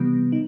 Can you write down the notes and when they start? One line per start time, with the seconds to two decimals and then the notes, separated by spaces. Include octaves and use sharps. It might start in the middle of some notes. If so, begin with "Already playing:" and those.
Already playing: C3 E3 G3 B3
0.32 D#4